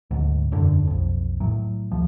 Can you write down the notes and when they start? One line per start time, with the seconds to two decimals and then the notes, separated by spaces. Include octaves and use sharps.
0.11 D2 G#2
0.52 E1 F#2 D3
0.87 B1 F2
1.40 A2 F#3
1.91 D2 C3 F3